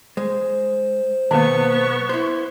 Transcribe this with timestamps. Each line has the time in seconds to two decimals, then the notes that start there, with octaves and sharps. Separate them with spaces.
0.17 G#3 C5
1.31 B1 D#3 A#3 B3 C#6
2.09 E4 C5